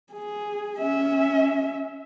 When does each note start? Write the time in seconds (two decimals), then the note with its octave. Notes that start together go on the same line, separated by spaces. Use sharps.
0.12 G#4
0.78 C#4 E5